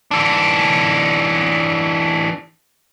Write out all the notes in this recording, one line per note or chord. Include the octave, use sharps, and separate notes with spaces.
E3 D4